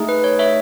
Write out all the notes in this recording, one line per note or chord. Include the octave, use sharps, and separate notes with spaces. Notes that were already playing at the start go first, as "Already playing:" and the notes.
Already playing: A3 D#4 G#4
B4
C#5
C#5 E5